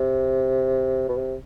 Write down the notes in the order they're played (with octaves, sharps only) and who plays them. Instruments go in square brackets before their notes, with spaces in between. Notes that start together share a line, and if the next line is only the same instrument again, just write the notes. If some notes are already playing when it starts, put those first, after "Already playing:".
Already playing: [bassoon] C3
B2
C3